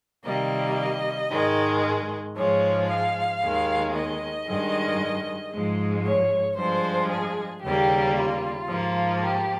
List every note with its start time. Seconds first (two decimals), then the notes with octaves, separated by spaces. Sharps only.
0.24 C3 D#3 G3 A#3 D#5
1.31 G#2 D#3 G#3
2.36 G#2 F3 G#3 C#5
2.89 F5
3.41 D#2 D#3 G#3
3.94 D#5
4.46 G2 D#3 G#3
5.51 G#2 F3 G#3
6.04 C#5
6.57 G2 F3 G#3 C5
7.10 G#4
7.63 D#2 C#3 G3 A#3 G4
8.16 F4
8.68 G#2 F3 A#3
9.21 G4